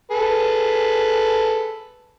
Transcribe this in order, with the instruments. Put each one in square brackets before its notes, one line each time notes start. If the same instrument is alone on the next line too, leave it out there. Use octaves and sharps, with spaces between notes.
[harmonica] G#4 A4 B4